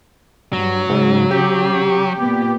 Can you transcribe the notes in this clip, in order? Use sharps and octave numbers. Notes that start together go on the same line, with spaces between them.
G2 F#3
G#2 C#3
G4
A#2 B3